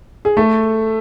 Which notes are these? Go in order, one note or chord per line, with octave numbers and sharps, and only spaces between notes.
G#4
A3 A4